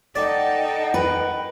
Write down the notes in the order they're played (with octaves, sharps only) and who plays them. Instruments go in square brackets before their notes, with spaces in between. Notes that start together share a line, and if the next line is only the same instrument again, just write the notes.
[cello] D#4 A4 [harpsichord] D5 [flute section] D#5 F#5 G5
[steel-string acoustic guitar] A#4 B4